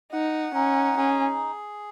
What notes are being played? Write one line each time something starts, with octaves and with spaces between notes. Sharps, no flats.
D#4 F#5
C#4 D#4
C#4 G#4